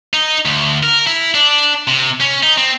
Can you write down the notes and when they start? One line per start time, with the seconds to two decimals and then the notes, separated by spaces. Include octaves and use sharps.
0.13 D#4
0.45 D2
0.83 A#4
1.07 E4
1.35 D4
1.88 C3
2.20 C#4
2.43 D#4
2.58 C4